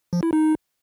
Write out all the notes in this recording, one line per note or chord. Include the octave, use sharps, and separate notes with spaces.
F3
E4
D#4